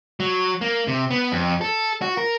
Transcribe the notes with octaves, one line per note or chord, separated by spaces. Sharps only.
F#3
A#3
C3
B3
F2
A4
F#4
A#4